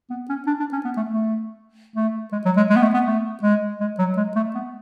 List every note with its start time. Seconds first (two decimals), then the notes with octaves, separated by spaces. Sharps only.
0.10 B3
0.29 C#4
0.47 D4
0.60 D4
0.72 C#4
0.85 B3
0.97 A3
1.09 A3
1.96 A3
2.32 G#3
2.45 F#3
2.57 G#3
2.70 G#3
2.76 B3
2.82 A3
2.94 B3
3.06 A3
3.43 G#3
3.81 G#3
3.99 F#3
4.17 G#3
4.36 A3
4.55 B3